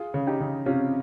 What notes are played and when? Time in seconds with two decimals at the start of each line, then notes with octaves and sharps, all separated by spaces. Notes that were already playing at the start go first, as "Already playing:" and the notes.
Already playing: F4 G#4
0.14 C#3
0.27 D#4 G4
0.40 C#3
0.66 C3 C#4 F4